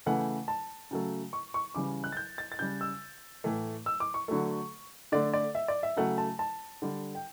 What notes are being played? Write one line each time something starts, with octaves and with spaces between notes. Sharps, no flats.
C#3 E3 A3 F#5
A5
C#3 F#3 A3
C#6
C#6
C#3 E3 G3 D6
F#6
A6
G6
A6
A6
C#3 G3 G6
E6
A2 E3 A3
E6
D6
C#6
D3 F#3 A3
D3 A3 D5
D5
E5
D5
E5
C#3 F#3 A3 F#5
A5
A5
D3 G3
G5